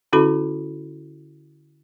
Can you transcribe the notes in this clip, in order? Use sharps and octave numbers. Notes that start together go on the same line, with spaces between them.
D3 C#4 E4 F#4 A4 B5